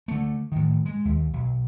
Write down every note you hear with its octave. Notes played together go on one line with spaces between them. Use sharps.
D3 A3
A2 D#3
G#3
D#2
B1